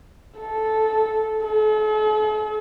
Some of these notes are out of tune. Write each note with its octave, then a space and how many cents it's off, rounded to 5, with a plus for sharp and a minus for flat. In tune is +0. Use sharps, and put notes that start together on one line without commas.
A4 -10
A4 -45